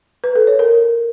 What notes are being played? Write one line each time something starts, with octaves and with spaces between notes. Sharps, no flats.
B4
A4
C#5
A#4